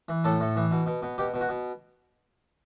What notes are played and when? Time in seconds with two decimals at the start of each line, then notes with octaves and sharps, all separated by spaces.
0.09 E3
0.24 A2 A4
0.40 A2
0.56 E3
0.71 B2
0.86 B2
1.02 B2
1.18 B2 G4
1.34 B2
1.41 F#4
1.49 B2